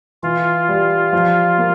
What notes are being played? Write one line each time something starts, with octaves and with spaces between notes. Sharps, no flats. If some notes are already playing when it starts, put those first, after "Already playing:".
E3 F4
G3
F3
A#3